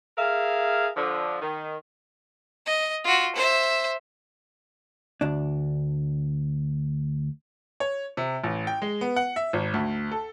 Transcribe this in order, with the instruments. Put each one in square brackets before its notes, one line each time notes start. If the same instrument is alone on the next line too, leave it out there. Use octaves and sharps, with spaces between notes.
[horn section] G#4 A#4 E5 F5
D3 F3
D#3
[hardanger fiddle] D#5
F4 F#4
C5 E5
[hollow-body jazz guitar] D2 D4
[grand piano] C#5
C3
A1
G5
G#3
B3
F#5
E5
G#1
D2
A4